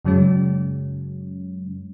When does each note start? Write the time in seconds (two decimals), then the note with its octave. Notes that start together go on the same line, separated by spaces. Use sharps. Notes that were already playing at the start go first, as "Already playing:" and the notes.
0.05 F#2 C#3 F#3 G#3 C#4